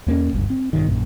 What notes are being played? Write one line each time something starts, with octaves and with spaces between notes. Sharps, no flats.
E2 A#3 B3 C#4
F#1 D2 G2
C4
A#1 G2 B2 D#3
A#1 F#2 A#2